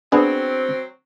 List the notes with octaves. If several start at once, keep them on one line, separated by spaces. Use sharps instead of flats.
F#3 B3 C4 D4 G#4